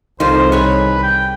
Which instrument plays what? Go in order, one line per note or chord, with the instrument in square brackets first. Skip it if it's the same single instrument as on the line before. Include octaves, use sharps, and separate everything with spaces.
[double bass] C2 [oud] F2 F4 [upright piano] D#3 [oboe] C5
[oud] G#4 C#5 [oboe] B4
[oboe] G5